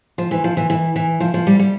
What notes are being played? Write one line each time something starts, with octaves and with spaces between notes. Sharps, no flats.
F3
E3
F3
E3
E3
E3
F3
F3
G3
G3